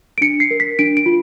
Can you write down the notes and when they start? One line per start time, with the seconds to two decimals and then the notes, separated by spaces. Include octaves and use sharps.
0.18 D7
0.21 D4 C#7
0.40 C7
0.51 A#4
0.60 B6
0.79 D4 D7
0.97 D7
1.06 F4